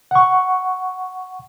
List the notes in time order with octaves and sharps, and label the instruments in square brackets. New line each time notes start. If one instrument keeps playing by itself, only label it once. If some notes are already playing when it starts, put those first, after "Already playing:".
[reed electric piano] F#5 C#6